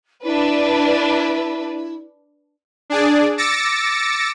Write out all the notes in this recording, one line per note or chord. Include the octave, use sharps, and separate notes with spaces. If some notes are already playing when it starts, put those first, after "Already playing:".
D4 E4 B4
D4 G#4 D5
D6 E6 A6 A#6 C#7